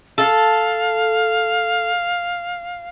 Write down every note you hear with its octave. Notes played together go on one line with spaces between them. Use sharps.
A4 F5